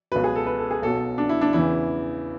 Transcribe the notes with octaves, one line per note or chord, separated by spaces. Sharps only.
C#2 B2 F#3 B4
G#4
A4
B4
A4
G#4
B1 B2 F#3 A4
D4
E4
D4
E2 C#3 E3 E4